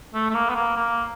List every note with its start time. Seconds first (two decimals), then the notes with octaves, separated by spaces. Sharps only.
0.14 A3
0.30 A3
0.35 A#3
0.50 B3
0.55 A#3
0.76 A#3